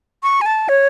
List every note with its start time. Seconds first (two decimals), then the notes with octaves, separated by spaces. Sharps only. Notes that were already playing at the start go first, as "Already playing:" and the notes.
0.23 C#6
0.41 G#5
0.46 A5
0.69 C#5